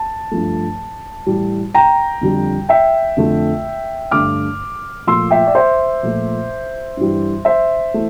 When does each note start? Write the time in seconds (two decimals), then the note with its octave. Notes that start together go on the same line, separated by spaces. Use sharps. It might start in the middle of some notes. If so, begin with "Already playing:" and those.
Already playing: A5
0.31 G2 F3 A3
1.26 A2 E3 G3
1.75 G5 A#5
2.21 F2 D3 G3
2.69 E5 G5
3.17 F2 D3 A3
4.11 G2 D3 A3 D6 F6
5.07 A#2 F3 A3 C6 E6
5.31 E5 G5
5.47 D5
5.55 C5 E5
6.03 A#2 F3 A3
6.97 G2 E3 G3
7.45 C5 E5
7.94 E3 A3